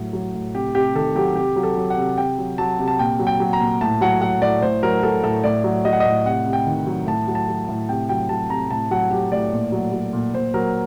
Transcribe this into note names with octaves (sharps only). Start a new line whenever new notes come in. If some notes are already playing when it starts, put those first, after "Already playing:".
Already playing: A2 F#3
F#3
A2
C3 G4
C3 G4
D#3 A4
F#3 G4
C3 G4
F#3
A4
F#3
F#5
C3
C3 G5
F#3
F#3 A5
C3
A5
A#2 G5
F#3
G5
F#3
A#5
A#2
A2 A5
F#3 F#5
F#3 F#5
A2 D5
A2 C5
F#3 A#4
F#3 A4
A2 A4
A2 D5
F#3
F#3 D#5
F#5
D#5
A2
C3 F#5
C3
G5
D#3
F#3
A2 A5
F#3
A5
F#3
A2
C3 G5
F#3 G5
F#3 A5
C3 A#5
A2 A5
F#3 F#5
F#3 G4
A2 D5
A#2
F#3
F#3
A#2
A#2 C5
F#3 A#4